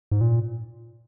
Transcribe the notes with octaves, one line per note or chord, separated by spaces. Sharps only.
G#2
A#2